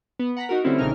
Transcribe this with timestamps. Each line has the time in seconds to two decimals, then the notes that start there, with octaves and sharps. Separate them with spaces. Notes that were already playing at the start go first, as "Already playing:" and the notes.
0.19 B3
0.37 F#5 A#5 B6
0.49 D#4 F#4 A#4
0.64 D3 G3 A3 C4 C#4 E4
0.79 A#1 C#3 E3 D#4 A#4 F6